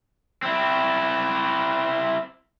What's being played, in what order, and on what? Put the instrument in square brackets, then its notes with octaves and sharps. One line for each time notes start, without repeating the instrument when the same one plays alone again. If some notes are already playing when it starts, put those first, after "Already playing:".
[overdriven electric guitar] C4 E4